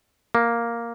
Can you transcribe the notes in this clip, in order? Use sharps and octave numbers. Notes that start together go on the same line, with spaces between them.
A#3